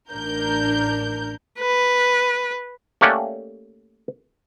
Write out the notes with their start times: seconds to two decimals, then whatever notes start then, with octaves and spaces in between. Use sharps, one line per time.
0.10 A1 D4 A#4 G6
1.60 B4
3.01 A3 A#3 C#4 G4 D5 F#5